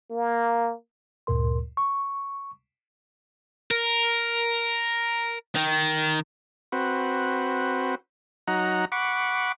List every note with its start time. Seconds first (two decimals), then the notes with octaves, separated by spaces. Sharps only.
0.10 A#3
1.27 D2 G2 A#2 A#4 C6
1.77 C#6
3.71 A#4
5.55 D#3
6.72 C4 F#4 B4
8.47 F#3 D#4 F#5 A#5
8.92 F#5 B5 C#6 D6